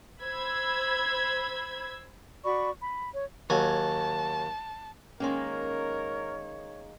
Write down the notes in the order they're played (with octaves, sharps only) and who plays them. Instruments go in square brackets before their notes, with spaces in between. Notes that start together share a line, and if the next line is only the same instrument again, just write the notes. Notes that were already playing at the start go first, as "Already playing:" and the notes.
[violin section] C5 B5 E6 G#6
[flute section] F#4 D5 B5 C#6
B5
C#5
[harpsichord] D#2 F#3 G#5 [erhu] A5
[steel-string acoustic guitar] D#3 G#3 A#3 [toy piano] C#4 C6 [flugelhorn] A#4 [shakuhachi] C#5